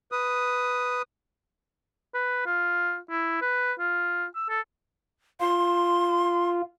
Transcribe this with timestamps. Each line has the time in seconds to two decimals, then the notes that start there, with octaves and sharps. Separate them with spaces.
0.12 B4 D#6
2.14 B4
2.46 F4
3.10 E4
3.42 B4
3.79 F4
4.35 E6
4.49 A4
5.40 F4 C6